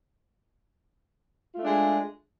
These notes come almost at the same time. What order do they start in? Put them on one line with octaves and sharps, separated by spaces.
F4 A3 D4 G#3